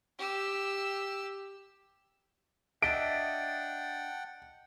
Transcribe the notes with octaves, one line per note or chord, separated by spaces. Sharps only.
G4 E6
D4 D#5 E5 F#5 G5 D7